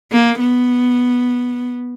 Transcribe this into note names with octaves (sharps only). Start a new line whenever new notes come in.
A#3
B3